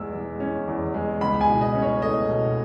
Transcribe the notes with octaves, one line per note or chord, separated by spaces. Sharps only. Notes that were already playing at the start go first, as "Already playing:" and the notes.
Already playing: E2 G#3 E6
G#3
C#4
E2
G#3
C#2 B5
G#5
B2
D#5
C#4
C#5
A3 D#5
B2